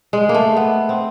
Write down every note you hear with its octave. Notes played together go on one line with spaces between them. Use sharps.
G#3
A#3
A3
B3
C4